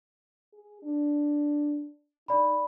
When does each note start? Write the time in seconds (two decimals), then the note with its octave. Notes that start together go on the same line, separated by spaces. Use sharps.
0.53 G#4
0.82 D4
2.28 D#4 D5 B5